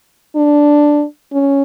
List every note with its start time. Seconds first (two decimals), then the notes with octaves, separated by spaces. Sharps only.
0.36 D4
1.33 C#4